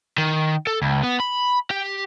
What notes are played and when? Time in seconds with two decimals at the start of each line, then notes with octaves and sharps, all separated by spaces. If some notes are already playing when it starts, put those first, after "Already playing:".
0.18 D#3
0.67 A4
0.82 C#2
1.04 B3
1.20 B5
1.71 G4